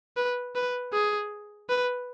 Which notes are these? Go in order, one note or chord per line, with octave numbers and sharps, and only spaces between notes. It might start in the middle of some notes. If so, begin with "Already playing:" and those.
B4
B4
G#4
B4